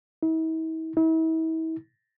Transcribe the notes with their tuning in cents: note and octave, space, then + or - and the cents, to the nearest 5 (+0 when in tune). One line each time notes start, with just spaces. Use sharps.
E4 -45
E4 -40